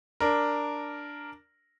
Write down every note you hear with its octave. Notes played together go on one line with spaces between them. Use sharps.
D4 A#4